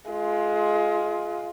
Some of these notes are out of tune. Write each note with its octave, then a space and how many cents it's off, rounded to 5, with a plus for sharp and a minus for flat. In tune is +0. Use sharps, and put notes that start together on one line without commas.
G#3 +25 F4 +0